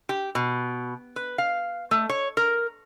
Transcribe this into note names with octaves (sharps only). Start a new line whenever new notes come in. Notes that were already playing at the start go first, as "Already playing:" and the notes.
G4
B2
B4
F5
A3
C#5
A#4